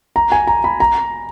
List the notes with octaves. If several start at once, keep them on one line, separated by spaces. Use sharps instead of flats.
A#5
G#5
A#5
B5
A#5